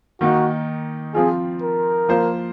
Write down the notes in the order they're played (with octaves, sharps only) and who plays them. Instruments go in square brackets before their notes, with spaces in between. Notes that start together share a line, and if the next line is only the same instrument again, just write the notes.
[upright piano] D#3 A#3 D#4 [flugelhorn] F#4
[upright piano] F3 C4 F4 [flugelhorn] G#4
[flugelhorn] A#4
[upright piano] F3 A#3 F4 C5